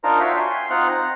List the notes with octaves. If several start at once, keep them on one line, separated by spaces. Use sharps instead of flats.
D4 D#4 F4 A#4 C5 A#5
F4 F#4 C#5 E5 F5 G5
G#5 C6
C4 D#4 F4 F#5 F6 F#6
A#5